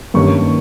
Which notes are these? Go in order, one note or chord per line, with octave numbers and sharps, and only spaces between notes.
G2 D#3 A#3 C#4 C#6